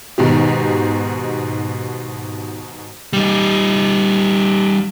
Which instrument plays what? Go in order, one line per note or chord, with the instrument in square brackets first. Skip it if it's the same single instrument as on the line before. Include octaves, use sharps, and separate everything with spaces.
[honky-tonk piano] G#2 B2 D#3 G4
[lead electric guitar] G3 D#4